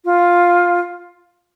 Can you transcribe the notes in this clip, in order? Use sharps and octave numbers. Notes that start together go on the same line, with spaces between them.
F4